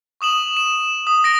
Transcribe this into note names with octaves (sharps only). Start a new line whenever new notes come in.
C#6 D#6 E7 F#7
E7
D#6
A#6 D7